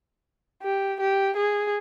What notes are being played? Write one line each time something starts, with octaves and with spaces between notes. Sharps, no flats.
G4
G4
G#4